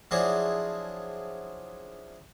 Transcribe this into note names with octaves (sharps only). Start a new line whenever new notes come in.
F3 F#3 D4 E4 G#4